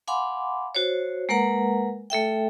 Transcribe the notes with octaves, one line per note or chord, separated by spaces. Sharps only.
F5 F#5 G#5 B5 C6 D6
F#4 C5 C#5
G#3 A#3 A#4 B4 F#5 A#5
A3 A4 E5 G5